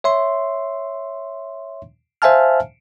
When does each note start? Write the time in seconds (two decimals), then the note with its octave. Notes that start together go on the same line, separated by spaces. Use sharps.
0.04 C#5 E5 C6
2.22 C5 E5 F5 G#5 A5 F6